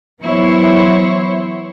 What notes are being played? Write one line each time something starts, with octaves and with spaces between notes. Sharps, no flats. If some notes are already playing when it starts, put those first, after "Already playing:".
E3 F#3 B3 E4 C5 C#5